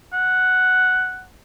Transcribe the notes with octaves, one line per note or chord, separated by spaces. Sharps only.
F#5